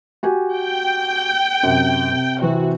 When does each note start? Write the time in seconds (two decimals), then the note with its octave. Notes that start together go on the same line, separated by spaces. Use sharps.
0.23 F#4 G4 G#5
0.55 G5
1.63 F#2 C3
2.11 C3
2.41 C3 E3 C4 F#4